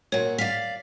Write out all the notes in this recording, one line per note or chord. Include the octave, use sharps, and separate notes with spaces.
A#2 F#4 C#5
D5 F5 B6